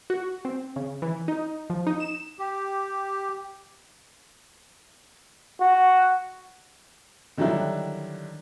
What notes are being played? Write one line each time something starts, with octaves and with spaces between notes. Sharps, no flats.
F#4
C4
C#3
E3
D#4
F3
D#4
E7
G4
F#4
D3 D#3 F#3 G3 D4 E4